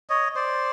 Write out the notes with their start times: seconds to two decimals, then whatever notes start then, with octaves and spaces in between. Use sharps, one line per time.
0.10 C#5 D#5
0.35 C5 D5